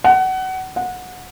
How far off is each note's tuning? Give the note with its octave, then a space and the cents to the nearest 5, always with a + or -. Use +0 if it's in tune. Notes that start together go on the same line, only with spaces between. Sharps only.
F#5 +25
F#5 -20